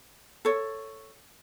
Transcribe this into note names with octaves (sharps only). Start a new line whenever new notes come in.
A4 C#5